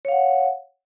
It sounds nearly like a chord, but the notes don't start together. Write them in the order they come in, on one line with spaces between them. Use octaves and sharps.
C#5 F5 F#5